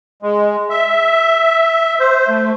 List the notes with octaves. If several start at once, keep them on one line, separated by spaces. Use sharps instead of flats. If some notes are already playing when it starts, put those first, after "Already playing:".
G#3
E5
C5
A3